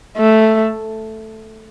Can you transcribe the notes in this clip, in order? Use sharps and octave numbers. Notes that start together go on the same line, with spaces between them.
A3